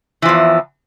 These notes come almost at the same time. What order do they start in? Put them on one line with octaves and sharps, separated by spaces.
E3 F3 E2